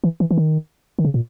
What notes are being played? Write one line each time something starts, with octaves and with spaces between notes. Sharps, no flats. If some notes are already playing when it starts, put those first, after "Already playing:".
E3
E3
E3
D#3
D#3
C#3
A#2